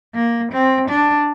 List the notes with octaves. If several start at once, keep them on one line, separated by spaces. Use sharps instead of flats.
A#3
C4
D4